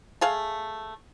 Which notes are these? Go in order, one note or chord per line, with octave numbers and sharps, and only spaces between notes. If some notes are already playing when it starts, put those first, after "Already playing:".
A3 G#4 F5